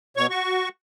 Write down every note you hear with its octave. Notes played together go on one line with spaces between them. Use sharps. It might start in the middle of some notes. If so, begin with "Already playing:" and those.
B2 C#5 C#6
F#4 C#6